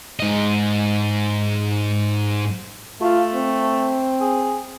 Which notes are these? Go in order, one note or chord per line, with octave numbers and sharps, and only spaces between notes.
G#2 D#5
A3 F4
C4
G#4